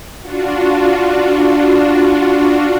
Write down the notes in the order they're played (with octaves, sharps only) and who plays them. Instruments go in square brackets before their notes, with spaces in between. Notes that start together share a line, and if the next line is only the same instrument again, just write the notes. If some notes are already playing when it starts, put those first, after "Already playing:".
[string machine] D4 F4 F#4